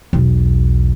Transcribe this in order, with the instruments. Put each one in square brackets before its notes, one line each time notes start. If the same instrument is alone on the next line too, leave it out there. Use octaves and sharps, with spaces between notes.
[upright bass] B1 E2